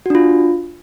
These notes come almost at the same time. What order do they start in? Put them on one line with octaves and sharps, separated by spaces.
F#4 D4 F4